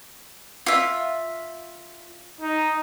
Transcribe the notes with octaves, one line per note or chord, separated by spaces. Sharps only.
F4 E5
D#4